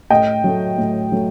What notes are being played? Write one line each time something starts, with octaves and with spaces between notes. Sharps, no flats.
A2 D#5 G5
F#3 A3
A2
F#3 A3